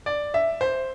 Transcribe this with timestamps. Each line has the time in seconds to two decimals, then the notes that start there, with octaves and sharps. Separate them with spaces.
0.06 D5
0.34 E5
0.61 C5